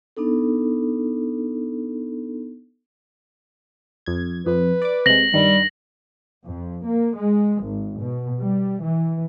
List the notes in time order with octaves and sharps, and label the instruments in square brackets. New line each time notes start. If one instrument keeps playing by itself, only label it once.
[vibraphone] B3 D4 D#4 A4
[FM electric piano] F2 G#6
[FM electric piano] F2 [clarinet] B4
[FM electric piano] D5 D6
[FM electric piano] C3 G#3 [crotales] A#6 F#7
[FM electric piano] G2 D#3 [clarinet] G3
[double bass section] F2
A#3
G#3
G#1
B2
G3
E3